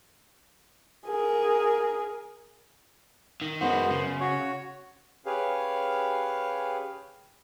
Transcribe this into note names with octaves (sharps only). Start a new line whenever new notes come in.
G#4 A#4
D#3
F#2 G#3 B3 F#4 C5
C#3
F#4 C#5
C#4 G4 G#4 B4 F5